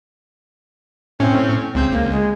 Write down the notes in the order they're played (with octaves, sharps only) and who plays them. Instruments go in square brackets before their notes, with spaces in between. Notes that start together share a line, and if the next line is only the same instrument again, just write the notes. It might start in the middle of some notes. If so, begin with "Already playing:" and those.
[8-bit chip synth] A2 C#4 [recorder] C4
[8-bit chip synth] C#2 C4 G6
[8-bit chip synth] C#2 [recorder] A#3
[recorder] G#3